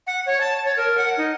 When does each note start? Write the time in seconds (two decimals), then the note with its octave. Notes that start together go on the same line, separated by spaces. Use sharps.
0.07 F#5
0.26 C#5
0.41 A5
0.65 C#5
0.77 A#4
0.98 F#5
1.17 D#4